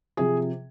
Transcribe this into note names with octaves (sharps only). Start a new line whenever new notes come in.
C3 F3 G#4